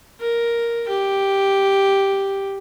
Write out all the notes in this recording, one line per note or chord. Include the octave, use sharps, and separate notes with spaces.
A#4
G4